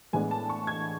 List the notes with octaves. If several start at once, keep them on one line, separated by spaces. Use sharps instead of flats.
A2 E3 G#3 B3 D4 G#5
A5
C#6
G#6